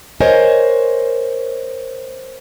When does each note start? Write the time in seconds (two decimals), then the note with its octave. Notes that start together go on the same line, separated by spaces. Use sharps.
0.20 A#4 C5 C#5 D#5 G#5